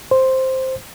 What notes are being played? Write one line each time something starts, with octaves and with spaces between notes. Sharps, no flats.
C5